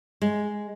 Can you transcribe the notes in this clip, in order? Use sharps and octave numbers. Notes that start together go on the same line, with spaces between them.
G#3